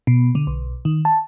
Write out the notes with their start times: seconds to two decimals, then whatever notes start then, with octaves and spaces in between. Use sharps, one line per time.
0.07 B2
0.35 D3
0.47 B1
0.85 D#3
1.05 A5